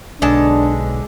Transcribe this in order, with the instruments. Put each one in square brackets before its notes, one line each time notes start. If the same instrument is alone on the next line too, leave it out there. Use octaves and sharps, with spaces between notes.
[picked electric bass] B1 [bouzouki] D3 G#3 A5 [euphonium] D4